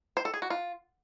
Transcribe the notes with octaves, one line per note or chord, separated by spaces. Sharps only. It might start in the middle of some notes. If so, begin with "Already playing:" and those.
C5
A4
G#4
F#4
F4